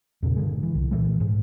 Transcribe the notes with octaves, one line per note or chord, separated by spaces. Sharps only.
E2 A#2 C#3
G2 D3 G#3
E3
C2
A#2 E3 G#3
G#2